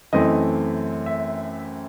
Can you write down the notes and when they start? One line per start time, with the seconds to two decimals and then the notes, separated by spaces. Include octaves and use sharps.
0.12 F#2 E3 A3 C4 D#5
1.06 E5